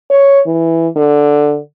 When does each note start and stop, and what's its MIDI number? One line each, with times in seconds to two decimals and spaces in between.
0.10 0.40 73
0.47 0.88 52
0.96 1.58 50